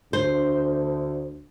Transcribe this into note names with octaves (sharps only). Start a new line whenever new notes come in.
D2 C5